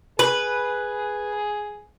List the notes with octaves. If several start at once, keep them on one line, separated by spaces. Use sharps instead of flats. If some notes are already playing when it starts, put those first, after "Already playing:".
G#4 B4